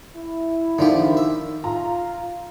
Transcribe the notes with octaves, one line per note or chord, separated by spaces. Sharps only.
E4
D3 D#3 F3 G4
E5
F4 A#5